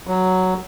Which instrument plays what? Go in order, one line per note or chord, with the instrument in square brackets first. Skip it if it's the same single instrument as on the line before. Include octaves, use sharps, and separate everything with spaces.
[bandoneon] F#3